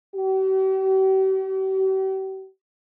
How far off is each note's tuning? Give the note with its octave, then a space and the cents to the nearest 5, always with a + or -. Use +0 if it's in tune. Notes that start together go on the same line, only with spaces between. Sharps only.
G4 -45